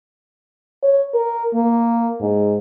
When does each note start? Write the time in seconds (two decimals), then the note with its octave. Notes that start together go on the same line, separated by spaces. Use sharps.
0.83 C#5
1.14 A#4
1.54 A#3
2.21 G#2